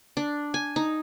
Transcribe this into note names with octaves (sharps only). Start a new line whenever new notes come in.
D4
G#5
D#4